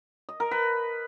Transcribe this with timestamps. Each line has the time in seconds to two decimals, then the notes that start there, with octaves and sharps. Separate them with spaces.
0.29 D#5
0.40 A#4
0.51 B4